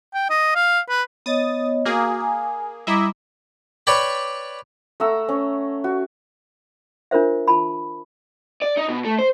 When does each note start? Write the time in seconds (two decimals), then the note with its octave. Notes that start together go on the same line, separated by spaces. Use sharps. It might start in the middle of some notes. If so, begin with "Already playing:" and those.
0.14 G5
0.30 D#5
0.56 F5
0.89 B4
1.26 B3 C#5 D#5 D#6 A6
1.86 A#3 F#4 G#4
2.21 G#5
2.87 G3 E4 D#5 E5 A#5 D6
3.87 B4 C#5 D5 G5 B5
5.00 A3 F#5 A#5 E6
5.29 C#4
5.84 F#4
7.11 D4 F4 A#4 C5 E5
7.48 F4 A5 B5
8.62 D5
8.77 D#4
8.89 B2
9.05 A3
9.19 C5